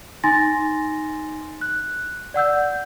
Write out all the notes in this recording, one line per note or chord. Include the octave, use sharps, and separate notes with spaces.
D#4 G#5 C6 A6 A#6
F#6
D5 F#5 E6 G6